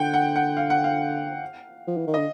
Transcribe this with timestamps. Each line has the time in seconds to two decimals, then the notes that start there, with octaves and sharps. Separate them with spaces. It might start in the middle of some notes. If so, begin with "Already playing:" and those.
Already playing: D3 F#5 G5
0.14 F#5
0.36 F#5
0.57 F5
0.70 F#5
0.84 F5
1.88 F3
1.97 E3
2.07 D#3
2.14 D3 D#5